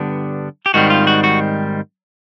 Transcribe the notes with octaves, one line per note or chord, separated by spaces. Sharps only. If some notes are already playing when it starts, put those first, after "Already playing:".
Already playing: G2 D3 G3 B3 D4
G4
G#2 D#3 G3 C4 F#4
F4
F#4
F#4